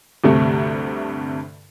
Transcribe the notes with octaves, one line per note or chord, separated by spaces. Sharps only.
D2 G2 C3 A3